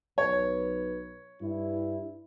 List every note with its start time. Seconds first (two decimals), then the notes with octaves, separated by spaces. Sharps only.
0.18 B1 B4 C#5
1.42 G2 E4